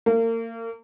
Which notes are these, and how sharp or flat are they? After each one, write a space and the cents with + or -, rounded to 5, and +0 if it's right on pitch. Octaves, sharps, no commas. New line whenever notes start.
A#3 -35